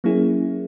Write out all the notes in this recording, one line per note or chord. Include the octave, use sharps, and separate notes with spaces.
F#3 A#3 C#4 E4 G#4